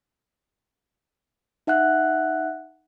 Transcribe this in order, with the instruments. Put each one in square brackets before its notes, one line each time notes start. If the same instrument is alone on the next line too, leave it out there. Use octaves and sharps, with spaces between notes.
[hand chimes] D#4 E5 F#5 F#6